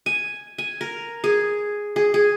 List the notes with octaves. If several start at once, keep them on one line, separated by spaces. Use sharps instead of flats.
G#5
G#5
A#4
G#4
G#4
G#4